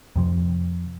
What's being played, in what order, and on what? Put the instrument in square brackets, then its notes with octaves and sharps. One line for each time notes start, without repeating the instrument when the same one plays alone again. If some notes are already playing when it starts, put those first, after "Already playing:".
[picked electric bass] F2 C3 F3